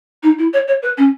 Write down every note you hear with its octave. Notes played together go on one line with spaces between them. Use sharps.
D#4
E4
C#5
C#5
B4
C#4